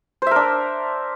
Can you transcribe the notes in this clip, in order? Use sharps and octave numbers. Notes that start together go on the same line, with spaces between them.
D4 A#4 C5 E5